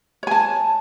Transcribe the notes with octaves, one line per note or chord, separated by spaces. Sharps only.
C#5 G#5 A5